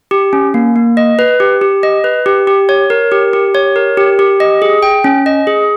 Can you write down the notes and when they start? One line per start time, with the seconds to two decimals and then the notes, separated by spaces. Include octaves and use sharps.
0.11 G4
0.33 C#4
0.54 A#3
0.76 A#3
0.97 D#5
1.19 B4
1.40 G4
1.61 G4
1.83 D#5
2.04 B4
2.26 G4
2.47 G4
2.69 C#5
2.90 A#4
3.12 G4
3.33 G4
3.55 C#5
3.76 A#4
3.97 G4
4.19 G4
4.40 D#5
4.62 G#4
4.83 G5
5.04 C#4
5.26 D#5
5.47 G#4